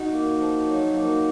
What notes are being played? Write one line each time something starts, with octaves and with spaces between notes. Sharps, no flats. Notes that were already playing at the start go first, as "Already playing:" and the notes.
Already playing: D#4 F#4
A#3
F3
F#3
A#3